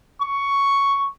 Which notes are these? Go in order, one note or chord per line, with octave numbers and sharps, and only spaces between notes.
C#6